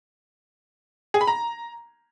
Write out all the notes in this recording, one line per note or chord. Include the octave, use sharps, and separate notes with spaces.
G#4
B5
A#5